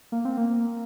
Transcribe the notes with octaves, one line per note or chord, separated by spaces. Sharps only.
A#3
C4
A#3